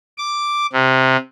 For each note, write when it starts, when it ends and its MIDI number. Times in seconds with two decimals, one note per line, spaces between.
0.18 0.66 86
0.73 1.17 48